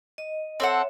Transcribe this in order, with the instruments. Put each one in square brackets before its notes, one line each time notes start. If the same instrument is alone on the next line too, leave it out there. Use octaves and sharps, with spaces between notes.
[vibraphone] D#5
[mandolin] C4 A4 F#5 [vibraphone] C#5 E5